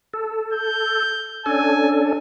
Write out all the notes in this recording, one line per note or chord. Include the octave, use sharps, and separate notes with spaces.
A4
G6
C#4 D4 A4 G#5